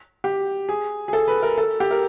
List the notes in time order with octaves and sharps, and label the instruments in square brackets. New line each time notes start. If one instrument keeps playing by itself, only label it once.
[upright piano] G4
G#4
G#4
A4
B4
A#4
A4
G4
A#4